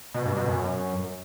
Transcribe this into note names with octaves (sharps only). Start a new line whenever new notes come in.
B2
G2
B2
F#2